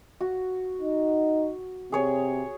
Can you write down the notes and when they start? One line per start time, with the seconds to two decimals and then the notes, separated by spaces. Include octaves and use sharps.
0.21 F#4
0.81 D#4
1.92 C3 G#4 C#5 G#5